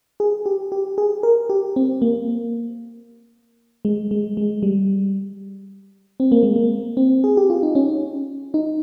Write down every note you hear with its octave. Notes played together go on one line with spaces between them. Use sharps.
G#4
G4
G4
G#4
A#4
G4
C4
A#3
G#3
G#3
G#3
G3
C4
A#3
G#3
A#3
C4
G#4
G4
F4
D#4
C#4
D#4